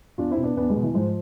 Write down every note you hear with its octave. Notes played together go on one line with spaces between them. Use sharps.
E2 D4 F4
C4 E4
B2
B3 D4
E2 B3 D4
G#3 B3
B2
E3
G#2 F3